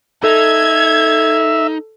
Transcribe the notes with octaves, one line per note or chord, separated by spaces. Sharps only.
D#4 A4 E5 G#6